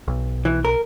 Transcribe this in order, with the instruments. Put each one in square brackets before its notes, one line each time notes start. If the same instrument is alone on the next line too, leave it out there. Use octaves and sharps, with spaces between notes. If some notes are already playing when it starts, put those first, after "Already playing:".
[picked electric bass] B1
[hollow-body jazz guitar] E3
A#4